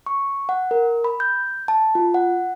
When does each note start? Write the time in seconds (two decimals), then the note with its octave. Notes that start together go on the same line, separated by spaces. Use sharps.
0.06 C#6
0.49 F#5
0.71 A#4
1.04 B5
1.20 G6
1.68 A5
1.95 F4
2.14 F#5